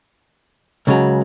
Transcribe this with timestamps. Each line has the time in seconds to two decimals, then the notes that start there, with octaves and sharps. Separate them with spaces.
0.87 C#2 C#3 F#3